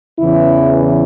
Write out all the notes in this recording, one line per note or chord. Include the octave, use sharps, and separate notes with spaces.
E2 C#3 E3 E4